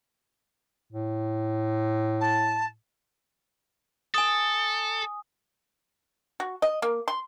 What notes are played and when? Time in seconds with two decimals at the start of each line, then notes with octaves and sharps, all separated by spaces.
0.93 A2
2.20 A5
4.14 A4 G#5 D#6
6.40 F#4
6.62 D#5
6.82 A#3
7.08 C6